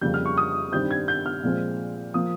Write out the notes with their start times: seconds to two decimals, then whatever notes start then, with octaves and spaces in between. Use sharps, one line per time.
0.01 F2 C#3 G3 A#3 G6
0.14 F6
0.26 C#6
0.37 D#6
0.72 G2 D#3 G3 C4 G6
0.91 G#6
1.08 G6
1.26 F6
1.43 A#2 F3 G#3 C4
2.14 F3 A#3 D#6